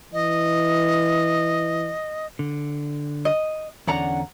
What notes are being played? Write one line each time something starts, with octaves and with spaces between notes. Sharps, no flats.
E3 D#5
D3
D#5
E2 D3 C#4 D5 F#5 A#5